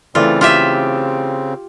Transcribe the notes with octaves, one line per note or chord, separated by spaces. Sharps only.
C#3 E3 A3 C4 F4 D5
F4 G4 E5